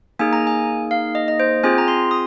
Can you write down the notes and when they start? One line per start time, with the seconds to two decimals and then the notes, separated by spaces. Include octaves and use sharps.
0.19 A#3 D#4 G#4 G#5
0.33 A#5
0.47 G#5
0.91 F5
1.15 D#5
1.28 D#5
1.40 C5
1.64 C4 F4 G#4 G#5
1.78 A#5
1.88 C6
2.11 D#6